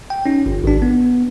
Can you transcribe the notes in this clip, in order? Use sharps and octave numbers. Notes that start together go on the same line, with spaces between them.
G5
C#4 D#4
G1
G#1 D4
B3